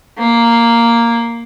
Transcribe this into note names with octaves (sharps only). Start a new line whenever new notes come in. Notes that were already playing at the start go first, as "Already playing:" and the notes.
A#3